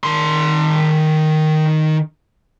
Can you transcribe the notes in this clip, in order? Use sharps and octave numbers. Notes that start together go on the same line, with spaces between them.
D#3 C6